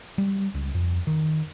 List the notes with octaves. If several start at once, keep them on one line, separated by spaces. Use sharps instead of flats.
G3
C#2
F2
D#3